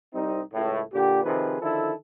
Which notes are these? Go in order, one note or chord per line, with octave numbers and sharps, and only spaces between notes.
C2 G3 C4 D#4
C#2 A2
A#2 D3 G4
C3 D#3 F3 G#4 B4
D3 D#3 F3 E4 A4